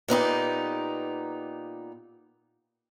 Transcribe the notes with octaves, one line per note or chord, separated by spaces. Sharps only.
A#2 B3 D#4 G4